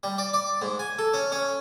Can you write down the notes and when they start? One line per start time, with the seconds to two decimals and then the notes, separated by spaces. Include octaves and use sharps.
0.03 G3
0.18 D5
0.34 D5
0.61 G#2
0.79 G#5
0.99 A4
1.14 C#4
1.32 C#4